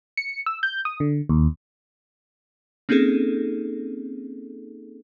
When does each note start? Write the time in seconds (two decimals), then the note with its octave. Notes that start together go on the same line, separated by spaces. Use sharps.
0.17 C#7
0.46 E6
0.63 G6
0.85 D#6
1.00 D3
1.29 D#2
2.89 A#3 C4 C#4 D#4 G#4 A4